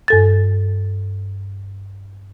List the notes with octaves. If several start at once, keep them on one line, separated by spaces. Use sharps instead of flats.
G2 A4 A6